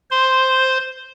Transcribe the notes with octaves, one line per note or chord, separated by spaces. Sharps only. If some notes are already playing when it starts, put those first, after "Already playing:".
C5 C6